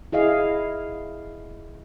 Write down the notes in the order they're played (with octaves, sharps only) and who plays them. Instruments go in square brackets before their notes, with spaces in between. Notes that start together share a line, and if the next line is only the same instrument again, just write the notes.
[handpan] E4 G#4 D#5 F5